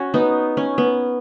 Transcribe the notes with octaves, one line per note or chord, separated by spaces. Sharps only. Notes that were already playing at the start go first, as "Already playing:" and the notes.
Already playing: C#4 F#4
B3 D#4
C#4
B3